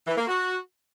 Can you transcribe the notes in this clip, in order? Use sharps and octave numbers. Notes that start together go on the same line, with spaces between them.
E3
A#3
F#4